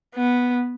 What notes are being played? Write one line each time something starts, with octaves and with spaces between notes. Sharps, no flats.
B3